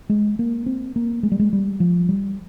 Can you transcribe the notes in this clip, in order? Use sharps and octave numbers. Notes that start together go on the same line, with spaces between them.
G#3
A#3
C4
A#3
G#3
G3
G#3
G3
F3
G3